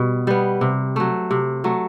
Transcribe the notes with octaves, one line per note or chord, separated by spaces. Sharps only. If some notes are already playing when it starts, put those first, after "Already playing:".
Already playing: B2 G3 B3
G3 B3
C3
F#3 A3
C3
F#3 A3